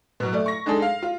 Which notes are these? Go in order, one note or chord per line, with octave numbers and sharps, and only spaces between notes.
B2 F#3
A3 D5
C#6 A#6
G#3 D4 D#4 G#4 A4
F5
F4